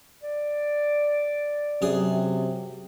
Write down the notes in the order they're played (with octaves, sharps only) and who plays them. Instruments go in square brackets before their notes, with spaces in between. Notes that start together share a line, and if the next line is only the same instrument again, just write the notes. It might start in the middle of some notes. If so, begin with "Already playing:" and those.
[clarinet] D5
[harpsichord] F#2 G#4 D#6 [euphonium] C3